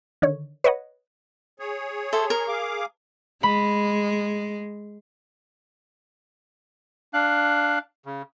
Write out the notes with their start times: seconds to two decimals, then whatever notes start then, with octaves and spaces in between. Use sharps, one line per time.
0.22 D3 D#3 C#5
0.64 B4 C#5 D#5 F#5
1.59 G#4 C#5
2.13 A4 C5 E5
2.30 A#4
2.48 G#4 F5 D6
3.43 G#3 B5
7.14 D4 F5 F#6
8.05 C#3